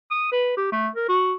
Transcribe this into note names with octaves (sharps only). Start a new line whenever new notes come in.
D#6
B4
G4
A3
A#4
F#4